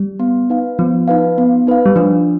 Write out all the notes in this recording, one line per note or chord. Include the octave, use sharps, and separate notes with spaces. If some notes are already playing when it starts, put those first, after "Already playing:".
Already playing: G3
B3
D#4 B4 F5
F3 B3
D#4 B4 F5
B3
D#4 B4 F5
G3
F3 D4